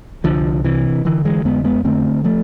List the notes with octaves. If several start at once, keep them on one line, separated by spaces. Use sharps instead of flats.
C2 D3 F3
C3 E3
D3 E3
E3 G#3
F2 G#3 B3
G#3 B3
D3 A3 C4
F3 A3